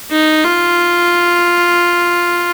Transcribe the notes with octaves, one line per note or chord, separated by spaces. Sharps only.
D#4
F4